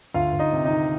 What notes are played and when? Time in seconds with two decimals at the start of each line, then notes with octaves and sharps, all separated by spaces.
0.14 D2 F4 F5
0.33 D2
0.39 D#4 D#5
0.52 C3
0.65 D#4 D#5
0.71 D#3